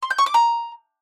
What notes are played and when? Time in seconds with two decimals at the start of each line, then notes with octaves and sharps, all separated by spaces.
0.03 C6
0.10 G6
0.18 C#6
0.26 D6
0.34 A#5